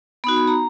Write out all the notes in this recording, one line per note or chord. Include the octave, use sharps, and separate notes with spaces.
B3 D#4 F#4 B5
B5
A#5